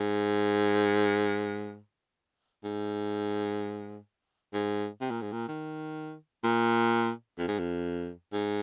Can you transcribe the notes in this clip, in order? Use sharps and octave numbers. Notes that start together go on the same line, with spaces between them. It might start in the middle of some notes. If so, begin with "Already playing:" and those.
Already playing: G#2
G#2
G#2
C3
A#2
G#2
A#2
D#3
A#2
F2
G#2
F2
G#2